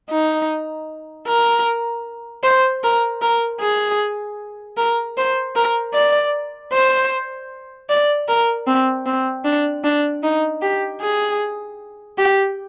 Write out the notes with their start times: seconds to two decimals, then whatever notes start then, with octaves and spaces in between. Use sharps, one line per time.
0.10 D#4
1.27 A#4
2.43 C5
2.84 A#4
3.22 A#4
3.60 G#4
4.77 A#4
5.17 C5
5.56 A#4
5.94 D5
6.73 C5
7.89 D5
8.28 A#4
8.67 C4
9.06 C4
9.44 D4
9.84 D4
10.23 D#4
10.62 G4
11.00 G#4
12.18 G4